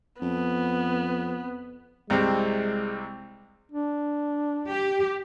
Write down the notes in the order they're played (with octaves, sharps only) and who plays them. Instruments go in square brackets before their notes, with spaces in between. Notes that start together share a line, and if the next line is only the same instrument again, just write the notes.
[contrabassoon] F2 [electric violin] B3
[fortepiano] C2 C3 C4 [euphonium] G#3
[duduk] D4
[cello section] G4